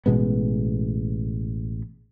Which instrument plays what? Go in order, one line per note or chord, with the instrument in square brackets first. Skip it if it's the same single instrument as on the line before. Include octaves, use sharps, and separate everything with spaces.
[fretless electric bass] A1 B2 G#3 B3